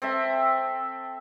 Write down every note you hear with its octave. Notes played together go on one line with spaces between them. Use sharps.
C4 A4 E5